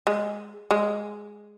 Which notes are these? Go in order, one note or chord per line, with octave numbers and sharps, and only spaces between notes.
G#3
G#3